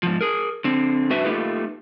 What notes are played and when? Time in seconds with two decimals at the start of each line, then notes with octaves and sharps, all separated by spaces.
0.03 G#2 F3
0.21 G#4 A#4
0.64 D3 C4
1.10 G2 D4 F#4 B4 E5
1.25 A3 A#3 D#4 F4 G4 B4